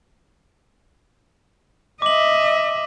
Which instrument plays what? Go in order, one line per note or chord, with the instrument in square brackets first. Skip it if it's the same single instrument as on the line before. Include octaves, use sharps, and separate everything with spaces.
[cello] D#5 E5 [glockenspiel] D6 F#7